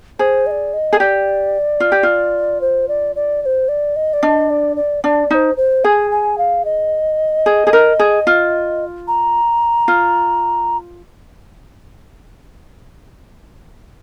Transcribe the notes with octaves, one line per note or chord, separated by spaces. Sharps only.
G#4 C5
D#5
D5
D#5
G#4
G4 D5
F4
G4
F4
C5
D5
D5
D5
C5
D5
D#5
D5
D4 D#5
D5
D5
D4 D5
D#4 C5 D5
C5
G#4 G#5
G#5
F5
D#5
G#4
G#4
A#4
G#4
F4
A#5
F4